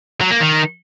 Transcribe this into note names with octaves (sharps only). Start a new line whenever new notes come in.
F#3
A#3
D#3